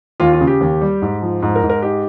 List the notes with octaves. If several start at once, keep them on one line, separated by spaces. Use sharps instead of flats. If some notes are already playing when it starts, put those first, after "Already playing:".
D#2 F4
F4
C#3
G4
D#2
G3
G#2
F3
G#2
A#4
G#2
A#4
D#4 G4